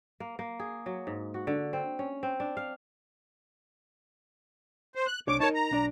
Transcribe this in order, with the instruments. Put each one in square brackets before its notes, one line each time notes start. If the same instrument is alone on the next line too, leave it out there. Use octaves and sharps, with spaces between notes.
[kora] A#3
A#3
G#4
F#3
G#2
F#4
D3
C4
C#4
C4
D4
F5
[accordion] C5
F#6
[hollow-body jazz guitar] C2 D4 C#5 [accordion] D6
[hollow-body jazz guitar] D#4 A#4 [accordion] C#5 A5
[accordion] A#5
[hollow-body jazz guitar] B1 D4 D5